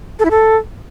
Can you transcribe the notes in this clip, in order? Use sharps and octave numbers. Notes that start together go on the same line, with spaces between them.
A4
E4
A4